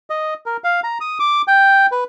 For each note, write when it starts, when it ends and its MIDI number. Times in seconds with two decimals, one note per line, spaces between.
0.10 0.34 75
0.46 0.57 70
0.64 0.80 77
0.84 0.98 82
1.01 1.18 87
1.19 1.42 86
1.48 1.86 79
1.91 2.04 71